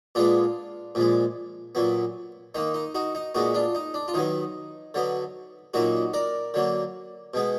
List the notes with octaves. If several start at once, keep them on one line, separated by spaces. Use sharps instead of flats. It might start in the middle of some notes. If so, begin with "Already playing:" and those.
A#2 G#3 B3 D4 F4
A#2 F3 G#3
A#2 F#3 B3
D#3 A#3 D#4
D#4
D#4 F#4
D#4
A#2 G#3 B3 D#4 F#4
D4 F4
D#4
D4
F4
D#3 F#3 B3 D#4
D3 F#3 B3
A#2 F#3 A#3 D#4 F#4
A#4 D5
D3 F#3 A#3
B2 G#3 B3